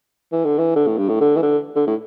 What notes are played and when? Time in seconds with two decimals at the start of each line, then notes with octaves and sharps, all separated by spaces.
0.32 E3
0.45 D3
0.59 E3
0.76 D3
0.87 A2
0.98 G2
1.09 A2
1.21 D3
1.37 E3
1.43 D3
1.76 D3
1.87 A2